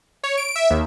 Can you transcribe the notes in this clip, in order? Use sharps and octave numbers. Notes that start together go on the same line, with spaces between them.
C#5
D7
E5
D#2